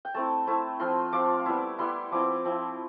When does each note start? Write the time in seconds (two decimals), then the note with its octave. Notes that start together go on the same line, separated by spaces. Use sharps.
0.05 G5
0.14 A3 C4 E4 A5
0.47 A3 C4 E4
0.80 F3 C4 F4 C6
1.12 F3 C4 F4 D6
1.46 G3 B3 E4
1.79 G3 B3 E4 C6
2.11 F3 C4 E4 D6
2.44 F3 C4 E4